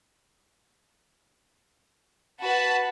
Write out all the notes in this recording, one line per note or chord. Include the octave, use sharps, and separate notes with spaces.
F#4 B4 A5 B5